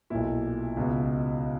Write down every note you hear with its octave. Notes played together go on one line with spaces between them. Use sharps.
B1 A#2 E4
C#2 B2